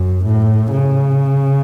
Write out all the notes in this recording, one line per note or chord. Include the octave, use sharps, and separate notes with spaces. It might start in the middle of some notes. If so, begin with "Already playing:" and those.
Already playing: F#2
A2
C#3